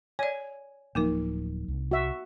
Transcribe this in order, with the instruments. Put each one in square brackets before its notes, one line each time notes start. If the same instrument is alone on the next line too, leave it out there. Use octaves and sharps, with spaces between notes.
[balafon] C#5 D5 [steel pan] G#5
[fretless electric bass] D1 F3 F#3 [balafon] A#3 D#4 A#4
[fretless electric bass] C2
[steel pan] F#4 E5